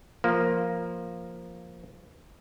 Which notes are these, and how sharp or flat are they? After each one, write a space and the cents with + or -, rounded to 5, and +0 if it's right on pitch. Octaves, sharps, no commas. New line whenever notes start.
F3 +0 A#3 +0